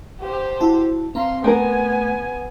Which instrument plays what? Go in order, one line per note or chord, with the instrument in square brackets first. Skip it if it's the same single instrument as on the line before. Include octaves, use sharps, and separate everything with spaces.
[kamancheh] G4 C5
[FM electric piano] E4 F#4 A5
[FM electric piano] C4 A#5 [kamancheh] F5 C6
[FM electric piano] A3 [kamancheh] B3 G#5 [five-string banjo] C4 G4 A#4